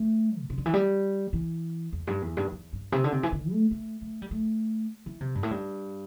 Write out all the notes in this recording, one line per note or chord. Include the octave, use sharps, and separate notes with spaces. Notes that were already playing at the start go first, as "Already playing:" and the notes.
Already playing: A3
A2
C3
D3
E3
G3
E3
E2
G2
E2
G2
E2
G2
C3
D3
C3
E3
D3
A3
A3
A3
G3
A3
E3
C3
G2
A2
G2